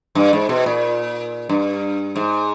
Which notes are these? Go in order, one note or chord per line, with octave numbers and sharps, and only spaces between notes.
G2
G#2
B2
A#2
G2
G#2